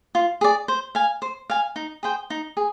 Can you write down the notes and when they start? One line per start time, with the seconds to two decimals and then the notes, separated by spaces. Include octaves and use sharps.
0.15 F4
0.41 G#4 D5
0.68 C5
0.95 F5 G#5
1.22 C5
1.50 F5 G#5
1.76 D#4
2.03 G#4 C5 G5
2.30 D#4
2.57 G#4